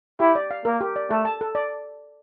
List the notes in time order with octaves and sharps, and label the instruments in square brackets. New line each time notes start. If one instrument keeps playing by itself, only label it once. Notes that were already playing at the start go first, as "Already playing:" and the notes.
[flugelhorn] E4 [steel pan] G4
[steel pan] D5
F5
[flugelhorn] A#3 [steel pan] A#4
[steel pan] G4
D5
[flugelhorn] A3 [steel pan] A4
[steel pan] A5
A4
D5